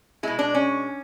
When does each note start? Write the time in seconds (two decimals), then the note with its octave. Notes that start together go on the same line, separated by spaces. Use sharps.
0.23 B2 G#3 E4
0.39 D4
0.54 C#4